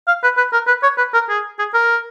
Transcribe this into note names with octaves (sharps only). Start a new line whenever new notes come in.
F5
B4
B4
A#4
B4
C#5
B4
A#4
G#4
G#4
A#4